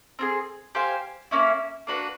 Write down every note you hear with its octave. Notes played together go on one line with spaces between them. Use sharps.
C4 F4 G#4
G4 C5 F5 G#5
A#3 C#4 E4
A#3 D4 F#4 B4